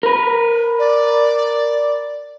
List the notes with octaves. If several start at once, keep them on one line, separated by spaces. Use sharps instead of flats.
A#4 B4
D5